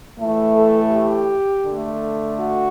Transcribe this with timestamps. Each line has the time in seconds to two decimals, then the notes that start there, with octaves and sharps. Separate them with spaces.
0.18 A2 E3 A3
0.55 A4
0.92 G4
1.66 D3 A3
2.40 F#4